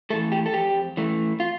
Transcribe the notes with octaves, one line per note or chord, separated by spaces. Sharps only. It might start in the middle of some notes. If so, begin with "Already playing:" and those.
E3 A3 A4
G4
A4
F2 G4
E3 A3
F4